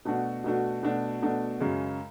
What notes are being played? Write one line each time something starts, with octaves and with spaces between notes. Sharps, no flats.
B2 A3 D4 F#4
B2 A3 D4 F#4
B2 A3 D4 F#4
B2 A3 D4 F#4
F#2 C#3 G#3